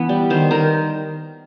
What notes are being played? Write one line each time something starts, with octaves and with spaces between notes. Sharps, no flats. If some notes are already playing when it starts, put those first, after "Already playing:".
Already playing: E3 B3
G3
D#3 C5
D#3 A#4